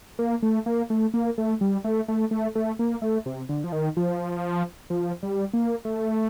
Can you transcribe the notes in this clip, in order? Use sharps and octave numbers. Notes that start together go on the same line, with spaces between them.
A#3
A3
A#3
A3
A#3
A3
G3
A3
A3
A3
A3
A#3
A3
C3
D3
F3
D#3
F3
F3
G3
A#3
A3